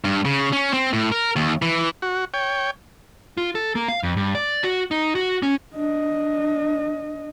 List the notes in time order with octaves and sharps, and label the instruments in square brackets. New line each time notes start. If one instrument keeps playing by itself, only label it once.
[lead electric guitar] G2
C#3
C#4
C4
A2
A#4
D#2
E3
[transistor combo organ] F#4
C#5 G5
[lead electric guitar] F4
A4
A#3
F5
F2
G2
D5
F#4
D#4
F#4
C#4
[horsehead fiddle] D4 D#5